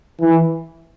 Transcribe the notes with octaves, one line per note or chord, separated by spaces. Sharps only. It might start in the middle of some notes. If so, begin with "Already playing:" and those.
E3